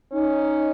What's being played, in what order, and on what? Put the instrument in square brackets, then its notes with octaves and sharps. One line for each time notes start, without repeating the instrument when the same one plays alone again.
[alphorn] C#4 [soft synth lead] D#4